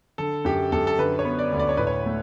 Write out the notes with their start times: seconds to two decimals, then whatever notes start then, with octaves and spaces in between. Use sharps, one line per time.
0.18 D3 A4
0.45 F#2 G4
0.72 F#2 A4
0.87 A4
0.99 D3 B4
1.19 C#5
1.25 B3
1.39 D5
1.53 D2
1.59 D5
1.69 C#5
1.77 A2 B4
1.87 C#5
2.06 A3